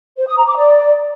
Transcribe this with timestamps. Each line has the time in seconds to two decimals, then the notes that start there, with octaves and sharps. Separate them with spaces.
0.17 C5
0.27 D#6
0.37 A#5
0.47 D6
0.57 D5